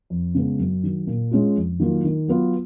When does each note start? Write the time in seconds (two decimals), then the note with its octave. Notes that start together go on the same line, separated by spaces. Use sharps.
0.10 F2
0.35 C#3 G#3 B3
0.59 F#2
0.83 D#3 F#3
1.07 A#2
1.31 G#3 C#4 F4
1.56 F2
1.80 D#3 F#3 A#3 F4
2.04 D#3
2.28 F#3 B3 F4